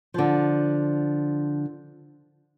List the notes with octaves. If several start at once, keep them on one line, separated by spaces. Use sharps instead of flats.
D3 F3